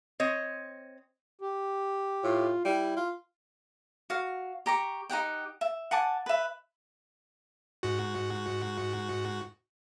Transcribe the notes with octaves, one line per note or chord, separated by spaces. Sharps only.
C4 C#5 D#5
G4
A2 F4
G3 E4
F4
F#4 F5
G4 A#5 C#6 D6
D#4 G4 F#5 G5
E5
F#5 G#5 A5 D6
B4 E5
G#2 F#4